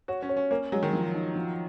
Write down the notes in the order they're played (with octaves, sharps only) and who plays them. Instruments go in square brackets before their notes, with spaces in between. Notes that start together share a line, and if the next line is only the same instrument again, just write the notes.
[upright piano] F#4 [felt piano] C#5
[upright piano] C#4
[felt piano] C#5
[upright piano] C#4
[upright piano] A#3 [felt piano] C#4
[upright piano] F#3 [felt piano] G#3
[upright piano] D#3
[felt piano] F3
D#4
F3